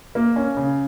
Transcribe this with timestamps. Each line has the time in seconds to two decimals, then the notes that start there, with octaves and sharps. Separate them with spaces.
0.15 A#3
0.36 C#4
0.57 C#3